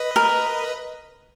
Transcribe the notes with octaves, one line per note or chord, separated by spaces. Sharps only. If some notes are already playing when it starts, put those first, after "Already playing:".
Already playing: B4 D#5
A#4